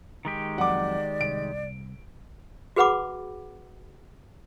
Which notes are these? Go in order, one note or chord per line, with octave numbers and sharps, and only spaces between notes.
D#3 G#3 G4
F2 F#3 D5 F#5 D6
C2 D7
F#4 G#4 B4 F#5 B5 D6